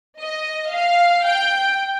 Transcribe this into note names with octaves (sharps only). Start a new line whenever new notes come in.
D#5
F5
G5